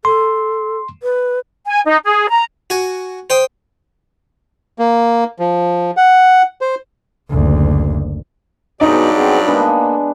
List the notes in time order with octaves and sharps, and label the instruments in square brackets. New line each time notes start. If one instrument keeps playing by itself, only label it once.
[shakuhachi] A4 [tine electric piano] C6
[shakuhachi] B4
[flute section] G#5
D#4
G#4
A#5
[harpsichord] F#4 G#5
C5 G5 D#6
[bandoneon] A#3
F3
F#5
C5
[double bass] F#1 D2
[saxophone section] G2 F#3 D5 [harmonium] B2 G#3 [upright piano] D#4
[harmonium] B3 C4 G#4
[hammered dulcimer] G#3 B3 D4 [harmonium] A#3